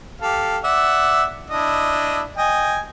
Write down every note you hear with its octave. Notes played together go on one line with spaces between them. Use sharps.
G4 A4 F5
D5 E5 F#5
D4 E4 D#5
D#5 G5 G#5